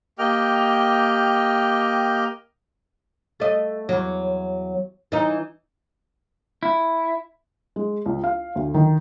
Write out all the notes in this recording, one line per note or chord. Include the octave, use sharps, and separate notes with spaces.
A#3 G4 D#5 G5 F6
A3 D#5
E2 F#3
E3 D#4
E4
G#3
C#2
F5
D2
D#3